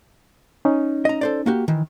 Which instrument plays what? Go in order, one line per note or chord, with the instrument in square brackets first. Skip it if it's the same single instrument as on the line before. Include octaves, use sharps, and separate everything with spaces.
[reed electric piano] C#4 D#4
[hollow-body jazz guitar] D#5 A#5
A4 C5 D5
A#3 F#4 G4
D#3 E3